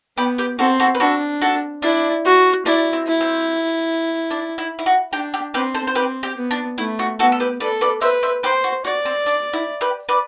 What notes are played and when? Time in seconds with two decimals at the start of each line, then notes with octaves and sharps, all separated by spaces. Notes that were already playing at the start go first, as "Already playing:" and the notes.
0.17 B3 G4 B4
0.38 G4 B4
0.59 C4 F#4 A4
0.80 F#4 A4
0.95 B4
1.00 D4 F#4 A4
1.41 F#4 A4
1.82 D4 E4
2.25 F#4
2.65 D4 E4
2.93 C4
3.07 E4
3.21 C4
4.31 D4
4.58 E4
4.79 E4
4.86 F#4
5.13 D4 G4
5.34 G4
5.54 C4 G4 B4
5.74 A4 C5
5.87 C5
5.95 C4 G4 B4
6.23 G4
6.37 B3
6.51 D4
6.78 A3 E4
6.99 F#4
7.19 B3 F#4 A4
7.32 A4
7.40 G4 B4
7.60 A4 B4 D5
7.81 B4 D5
8.01 B4 C5 E5
8.23 C5 E5
8.43 G4 B4 C5
8.64 F#4
8.85 F#4 D5
9.05 C4
9.26 D4
9.53 E4
9.81 G4 B4
10.09 B4 D5